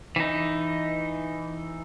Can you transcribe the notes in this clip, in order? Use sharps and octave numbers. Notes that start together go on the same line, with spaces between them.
E3 D#4